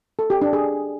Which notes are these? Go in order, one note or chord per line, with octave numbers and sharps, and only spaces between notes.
A4
G4
D4
G#4